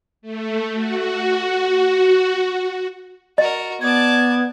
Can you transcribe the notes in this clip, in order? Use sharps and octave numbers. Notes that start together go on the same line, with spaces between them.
A3
F#4
F#4 A#4 D#5
B3 D5 A5 G#6